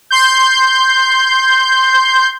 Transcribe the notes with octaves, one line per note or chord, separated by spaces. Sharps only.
C6 G6